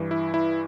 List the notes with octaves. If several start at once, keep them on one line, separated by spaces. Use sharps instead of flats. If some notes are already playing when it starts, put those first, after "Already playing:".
Already playing: G2 E3
E4
E4